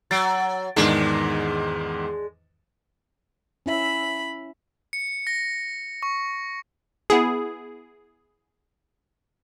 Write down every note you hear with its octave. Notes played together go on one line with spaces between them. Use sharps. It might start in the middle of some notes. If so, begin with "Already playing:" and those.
F#3 A6 D7
E2 G#2 D#3 G#3 D4
C#4 E4 E5 B5
C#7
A#6
C#6
B3 E4 G#4